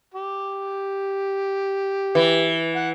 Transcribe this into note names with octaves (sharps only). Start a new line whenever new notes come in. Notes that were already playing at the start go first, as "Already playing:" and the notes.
G4
E3
F#5